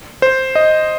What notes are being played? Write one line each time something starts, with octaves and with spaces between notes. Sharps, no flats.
C5
D#5